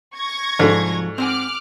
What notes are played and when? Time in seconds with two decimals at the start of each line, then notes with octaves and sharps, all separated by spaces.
0.15 C#6 G#6 A#6
0.59 C2 G#2 F3 F#4 A4 D5
1.18 C4 F#5 G#5 D6 F6 F#6